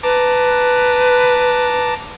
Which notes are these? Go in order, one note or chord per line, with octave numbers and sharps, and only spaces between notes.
B4 A5 A#5 D6